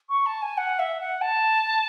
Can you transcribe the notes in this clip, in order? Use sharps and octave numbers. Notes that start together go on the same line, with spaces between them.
C#6
A5
G#5
F#5
E5
F#5
A5